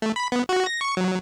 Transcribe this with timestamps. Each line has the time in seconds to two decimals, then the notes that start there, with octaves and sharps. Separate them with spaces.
0.02 A3
0.16 B5
0.32 B3
0.49 F#4
0.66 A#6
0.81 C#6
0.97 F#3